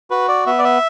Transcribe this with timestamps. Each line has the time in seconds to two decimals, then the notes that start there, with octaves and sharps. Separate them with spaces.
0.10 F#4 B4
0.28 D5
0.46 B3 E5
0.58 D5
0.64 E5